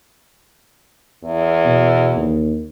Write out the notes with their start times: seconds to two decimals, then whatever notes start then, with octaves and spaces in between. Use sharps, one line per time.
1.24 E2
1.65 B2
2.16 D#2